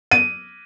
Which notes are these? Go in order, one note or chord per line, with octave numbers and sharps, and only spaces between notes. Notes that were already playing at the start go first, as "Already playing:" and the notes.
D#7